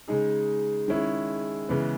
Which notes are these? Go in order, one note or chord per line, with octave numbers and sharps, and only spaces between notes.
C#3 G#3 D#4 G#4
D#3 G#3 C#4 E4 G#4
C#3 E3 G#3 B3